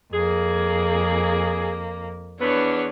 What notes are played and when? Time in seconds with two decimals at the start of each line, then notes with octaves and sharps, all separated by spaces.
0.13 F2 A#3 G#4
2.40 E2 B3 D4 C#5